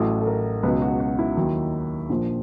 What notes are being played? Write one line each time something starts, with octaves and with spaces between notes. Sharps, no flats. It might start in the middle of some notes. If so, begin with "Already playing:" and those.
Already playing: A1 A2 F#3 A4
A4
A#4
C#2 B2 F#3 B4
F#4
F#4
E4
D#2 D#3 F#3
A#1 A#2 F3